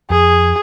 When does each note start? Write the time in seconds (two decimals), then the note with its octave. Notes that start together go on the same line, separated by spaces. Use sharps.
0.10 F2 G#4